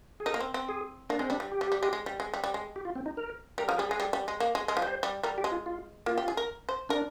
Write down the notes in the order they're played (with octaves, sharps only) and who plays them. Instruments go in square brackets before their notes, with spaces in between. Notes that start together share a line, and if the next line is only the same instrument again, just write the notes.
[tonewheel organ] G#4
[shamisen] D#4 [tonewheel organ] A#4
[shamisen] A#3
C4
C4
[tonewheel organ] G#4
[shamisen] A#3 [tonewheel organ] D4
[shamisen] G#3 [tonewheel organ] C4
[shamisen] G3 [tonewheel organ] D4
[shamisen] G3
[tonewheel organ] G4
[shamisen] G3
G3
G#3
G#3
G3
G#3
G3
G3
G#3
[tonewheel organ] G4
F4
C4
D#4
A#4
[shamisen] G3 [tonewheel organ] A#4
[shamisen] F3 [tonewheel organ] A#4
[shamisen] G3 [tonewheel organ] G#4
[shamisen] G#3 [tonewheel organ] G#4
[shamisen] G3
G3
G#3
A#3
[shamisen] G#3 [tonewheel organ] G#4
[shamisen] G#3 [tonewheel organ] A#4
[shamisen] F3
[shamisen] G3 [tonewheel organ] C5
[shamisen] G3
[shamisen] G3 [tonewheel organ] A#4
[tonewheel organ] G4
[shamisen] G#3
[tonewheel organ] F4
F4
[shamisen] A#3 [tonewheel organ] F4
[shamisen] G4
G#4
A#4
C5
[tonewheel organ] D4 [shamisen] A#4